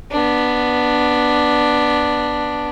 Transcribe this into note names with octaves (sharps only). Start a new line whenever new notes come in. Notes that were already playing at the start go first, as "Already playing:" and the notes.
B3 D4